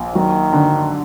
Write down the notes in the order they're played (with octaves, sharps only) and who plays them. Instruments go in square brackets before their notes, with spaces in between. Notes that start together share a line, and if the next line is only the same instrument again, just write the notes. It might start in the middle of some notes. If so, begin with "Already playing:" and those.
Already playing: [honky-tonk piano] A#1
[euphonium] D#3 [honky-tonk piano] F#3
[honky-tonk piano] D3